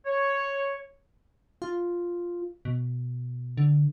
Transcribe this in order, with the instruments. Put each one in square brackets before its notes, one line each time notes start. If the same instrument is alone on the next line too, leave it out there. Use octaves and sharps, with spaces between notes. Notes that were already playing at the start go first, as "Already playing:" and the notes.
[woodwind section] C#5
[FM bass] F4
B2
D3